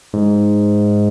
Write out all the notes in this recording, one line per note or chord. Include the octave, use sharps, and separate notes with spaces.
G#2